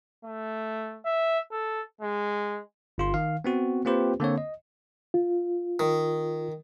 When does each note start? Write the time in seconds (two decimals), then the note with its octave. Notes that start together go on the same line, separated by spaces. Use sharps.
0.25 A3
1.05 E5
1.51 A4
2.01 G#3
2.98 G1 F4 C6
3.14 D#3 F5
3.45 B3 C4 F#4
3.85 A#3 C4 F4 G4 B4 C5
4.20 D3 A#3 C4 C#5
4.38 D#5
5.14 F4
5.79 D#3